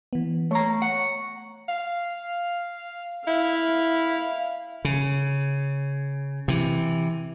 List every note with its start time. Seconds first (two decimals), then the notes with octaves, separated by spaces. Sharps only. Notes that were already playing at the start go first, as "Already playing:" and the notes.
0.13 E3 B3
0.51 A3 C#5 A#5 C#6
0.82 F#5
1.68 F5
3.27 E4 F5
4.85 C#3
6.48 C3 E3